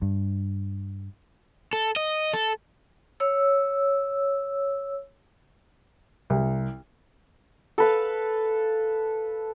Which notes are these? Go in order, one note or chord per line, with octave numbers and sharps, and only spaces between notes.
G2
A4
D#5
A4
C#5 E6
C2
A4 B4 F5